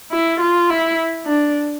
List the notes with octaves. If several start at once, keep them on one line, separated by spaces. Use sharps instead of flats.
E4
F4
E4
D4